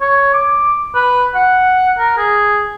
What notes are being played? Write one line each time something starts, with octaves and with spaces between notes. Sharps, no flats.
C#5
D6
B4
F#5
A#4
G#4